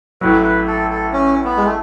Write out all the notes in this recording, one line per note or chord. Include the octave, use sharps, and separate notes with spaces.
A1 A2 F#3 B4
B4
A4
A4
C#4
B3
G#3
A3